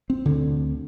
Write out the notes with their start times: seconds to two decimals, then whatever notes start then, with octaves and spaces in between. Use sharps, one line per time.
0.10 C4
0.25 D2 D3